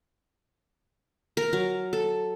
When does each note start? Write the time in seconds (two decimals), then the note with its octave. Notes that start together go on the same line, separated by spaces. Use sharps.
1.37 A#4
1.53 F#3
1.93 A4